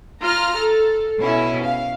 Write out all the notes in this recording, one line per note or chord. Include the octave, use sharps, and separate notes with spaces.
F4 A#5 F6
A4
B2 C#4 E4
F5